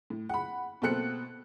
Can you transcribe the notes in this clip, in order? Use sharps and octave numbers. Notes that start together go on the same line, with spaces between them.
A2
F#5 B5
B2 A#3 C4 A4 F#6 C#7